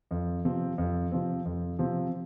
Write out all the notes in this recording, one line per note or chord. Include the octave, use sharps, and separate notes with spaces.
F2
C3 F3 C4
F2
C3 F3 C4
F2
C3 F3 C4